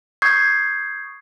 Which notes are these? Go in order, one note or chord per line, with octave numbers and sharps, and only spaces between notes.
C#6 D#6 G6 G#6 C7